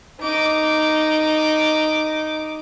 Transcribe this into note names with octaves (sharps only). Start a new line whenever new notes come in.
D#4 D6